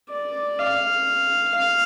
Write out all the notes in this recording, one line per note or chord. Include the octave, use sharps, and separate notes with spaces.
D5
F5
F5